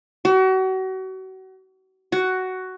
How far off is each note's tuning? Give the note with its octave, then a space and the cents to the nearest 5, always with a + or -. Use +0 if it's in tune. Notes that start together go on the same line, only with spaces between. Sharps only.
F#4 +35
F#4 +10